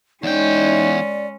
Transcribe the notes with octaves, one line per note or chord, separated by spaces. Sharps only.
E2 G#3 C#4 D#4 D5 G5